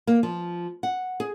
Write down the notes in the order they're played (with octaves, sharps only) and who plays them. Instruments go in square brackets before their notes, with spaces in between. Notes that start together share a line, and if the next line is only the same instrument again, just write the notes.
[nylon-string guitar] A#3
F3
F#5
G#4